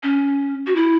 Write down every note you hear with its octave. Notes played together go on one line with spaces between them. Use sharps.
C#4
F#4
E4